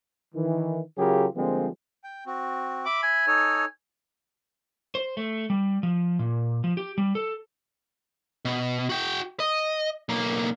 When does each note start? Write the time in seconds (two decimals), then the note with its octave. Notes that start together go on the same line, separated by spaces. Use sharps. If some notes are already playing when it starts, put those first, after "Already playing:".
0.34 D#3 E3
0.98 C#3 F#3 F4 G4 G#4 A#4
1.36 D3 F3 G3 G#3 A#3 C4
2.04 G5
2.26 C4 F#4
2.85 E5 B5 D6
3.03 G#5
3.27 D#4 A4 C#5
4.95 C5
5.17 A3
5.50 G3
5.83 F3
6.19 A#2
6.64 F3
6.77 G4
6.98 G3
7.15 A4
8.45 B2
8.89 F#4 G5
9.40 D#5
10.09 B1 A#3